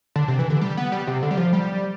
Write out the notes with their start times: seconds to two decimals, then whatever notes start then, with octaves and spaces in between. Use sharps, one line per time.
0.16 D3
0.28 C3
0.39 E3
0.50 D3
0.61 G3
0.77 B3
0.92 G3
1.07 C3
1.23 D3
1.31 G3
1.37 F3
1.53 G3